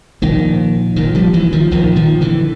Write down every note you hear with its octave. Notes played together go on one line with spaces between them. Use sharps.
A#1 A#2 D#3
A#1 A#2 D#3
F3 G3
E3 F#3
D#3 F3
A#1 A#2 D#3 F3
D#3 F3
D3 E3